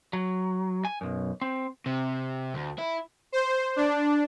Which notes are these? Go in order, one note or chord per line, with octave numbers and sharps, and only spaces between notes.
F#3
G#5
B1 F#2
C4
C3
D2
E4
C5
D4